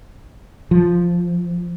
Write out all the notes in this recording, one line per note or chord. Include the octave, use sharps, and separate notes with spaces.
F3